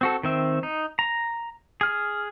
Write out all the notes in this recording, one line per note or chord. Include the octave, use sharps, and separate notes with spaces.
C4 F#4 A4
D#3 C4 E5
D#4
A#5
G#4 F6